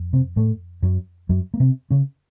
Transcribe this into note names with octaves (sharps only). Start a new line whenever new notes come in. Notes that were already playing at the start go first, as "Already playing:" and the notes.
Already playing: F2
C3 C4
A2 A3
F#2 F#3
F#2 F#3
A#3
C3 C4
C#3 C#4